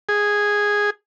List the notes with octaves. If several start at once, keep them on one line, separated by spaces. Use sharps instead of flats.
G#4